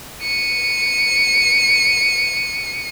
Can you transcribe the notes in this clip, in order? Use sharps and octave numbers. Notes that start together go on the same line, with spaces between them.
C#7 D#7